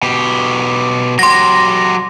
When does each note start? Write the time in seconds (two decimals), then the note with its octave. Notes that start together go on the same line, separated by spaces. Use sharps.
0.03 B2 G4
1.19 F#3 G4 C6 A#6